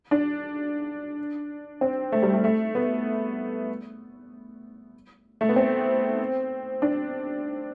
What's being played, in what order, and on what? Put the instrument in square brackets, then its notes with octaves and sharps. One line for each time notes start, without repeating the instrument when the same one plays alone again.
[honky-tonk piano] D4
C4
A3
G3
A3
A3
B3
A3
B3
C4
D4